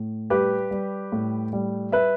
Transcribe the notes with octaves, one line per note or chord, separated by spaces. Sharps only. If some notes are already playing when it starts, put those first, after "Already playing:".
Already playing: A2
G3 G4 B4
G3
A2
G3
B4 E5